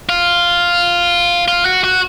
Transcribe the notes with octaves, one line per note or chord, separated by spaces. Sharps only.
F4
F4
F#4
F#4